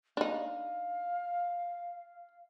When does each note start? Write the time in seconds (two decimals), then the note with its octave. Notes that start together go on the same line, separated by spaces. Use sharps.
0.17 D4 D#4 F5